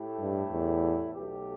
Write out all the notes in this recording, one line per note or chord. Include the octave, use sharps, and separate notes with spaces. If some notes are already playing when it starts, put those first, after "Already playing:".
Already playing: A2 A3 E4 G4
G2
E2
B1 B2 A3 G4